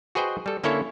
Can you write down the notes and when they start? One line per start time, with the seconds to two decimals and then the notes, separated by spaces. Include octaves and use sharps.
0.15 F#4 G#4 B4 C5 D#5 G5
0.46 G3 A4
0.64 D3 A#3 C#4 E4 A4 C#5